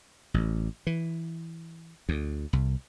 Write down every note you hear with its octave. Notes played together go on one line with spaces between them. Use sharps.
A1
E3
D2
C2